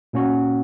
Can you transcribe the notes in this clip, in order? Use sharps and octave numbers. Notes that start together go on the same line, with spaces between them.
A#2 A#3 C#4 F#4